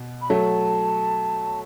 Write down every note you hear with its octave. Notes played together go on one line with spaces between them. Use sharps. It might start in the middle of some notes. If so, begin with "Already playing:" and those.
Already playing: B2
B5
F#3 A3 A5